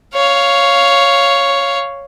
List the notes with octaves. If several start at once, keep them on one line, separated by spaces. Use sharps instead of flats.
C#5 F5